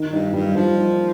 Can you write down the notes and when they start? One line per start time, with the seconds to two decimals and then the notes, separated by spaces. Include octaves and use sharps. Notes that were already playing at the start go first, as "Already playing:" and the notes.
Already playing: D#3
0.12 G2 D#4
0.33 G2 G3
0.55 F3 G3
0.78 D#4